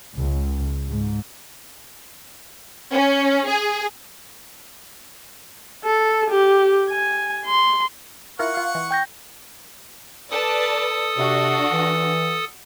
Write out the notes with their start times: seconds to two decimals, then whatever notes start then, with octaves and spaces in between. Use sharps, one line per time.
0.16 C#2
0.88 G#2
2.92 C#4
3.46 G#4
5.84 A4
6.30 G4
6.90 G#5
7.45 C6
8.39 E4 F4 A#4 F#5 C#6
8.54 F4 F5
8.75 E3
8.91 G5 G6 A#6
10.31 A4 B4 D5 A5 D#6
11.18 C3 D4 F#4
11.72 E3